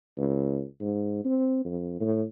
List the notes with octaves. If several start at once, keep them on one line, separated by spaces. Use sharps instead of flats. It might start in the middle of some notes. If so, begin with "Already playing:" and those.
C#2
G#2
C4
F2
A2